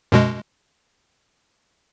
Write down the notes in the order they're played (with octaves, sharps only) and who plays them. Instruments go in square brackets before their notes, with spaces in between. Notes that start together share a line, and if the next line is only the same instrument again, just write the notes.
[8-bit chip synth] F#2 B2 G#3